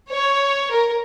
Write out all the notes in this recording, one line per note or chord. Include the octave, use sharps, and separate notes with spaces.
C#5
A#4